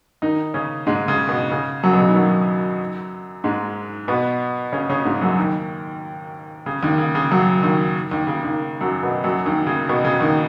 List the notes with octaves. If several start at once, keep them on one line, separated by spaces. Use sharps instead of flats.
D#3 D#4
C#3 C#4
G#2 G#3
C#3
B2
C#3
F#2 F#3
B2
C#3
D#3
F#2 F#3
G#2 G#3
B2 B3
C#3 C#4
C#3 C#4
G#2 G#3
F#2 F#3
D#2 D#3
C#3
D#2 D#3
C#3
C#3
F#2 F#3
D#2 D#3
D#2 D#3
C#3
D#2 D#3
F#2 F#3
B2 B3
F#2 F#3
D#2 D#3
C#3
B2
C#3
D#2 D#3